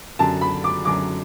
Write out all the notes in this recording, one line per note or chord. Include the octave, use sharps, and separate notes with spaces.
F#2 D3 F#3 A5
B5
D6
F#2 D3 F#3 D6